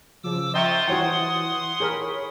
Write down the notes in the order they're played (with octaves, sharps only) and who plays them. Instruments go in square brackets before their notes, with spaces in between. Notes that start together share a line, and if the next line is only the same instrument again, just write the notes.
[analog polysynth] C#3 F3 [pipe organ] D6 E6
[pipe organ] F4 C5 C6 [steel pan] D#5 G5 C#6 [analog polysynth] E5 A#5
[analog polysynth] E3 [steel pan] F#4 C#5 G5 [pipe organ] F#5 C6 D#6
[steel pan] G#4 A#4 [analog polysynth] C#5 B5